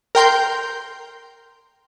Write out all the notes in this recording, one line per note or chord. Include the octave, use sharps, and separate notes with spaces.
A#4 G5 C6 G6